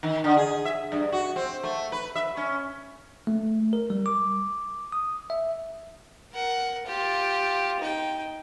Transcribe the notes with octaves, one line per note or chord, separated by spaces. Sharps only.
D#3
D3
G#4
E5
G2
F#4
C4
A3
B4
E5
C#4
A3
A#4
G3
D6
D#6
E5
A#4 F#5
F4 G4
D#4 G5